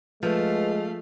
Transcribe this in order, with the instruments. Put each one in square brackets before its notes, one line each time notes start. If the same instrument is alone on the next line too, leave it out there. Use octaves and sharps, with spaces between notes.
[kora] F3 [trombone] G#3 [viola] A3 F5 [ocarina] B4